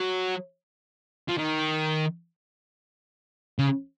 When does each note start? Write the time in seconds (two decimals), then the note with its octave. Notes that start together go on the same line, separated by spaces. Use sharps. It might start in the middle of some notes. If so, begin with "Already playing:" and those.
Already playing: F#3
1.28 F3
1.38 D#3
3.59 C#3